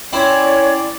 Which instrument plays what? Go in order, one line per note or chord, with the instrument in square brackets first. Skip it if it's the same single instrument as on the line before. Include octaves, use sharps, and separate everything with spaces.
[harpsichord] C4 E4 [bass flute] C#4 [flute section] C#5 [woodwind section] D5